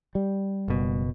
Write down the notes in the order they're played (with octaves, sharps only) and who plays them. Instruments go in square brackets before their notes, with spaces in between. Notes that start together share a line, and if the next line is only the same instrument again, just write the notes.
[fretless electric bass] G3
[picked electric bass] F#1 B2